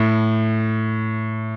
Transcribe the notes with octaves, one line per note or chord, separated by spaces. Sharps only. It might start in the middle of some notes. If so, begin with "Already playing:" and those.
Already playing: A2